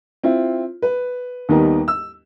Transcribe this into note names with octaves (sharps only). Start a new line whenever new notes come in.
C4 E4 F4
B4
D#2 D#3 G3 A#3 B3 D#4
E6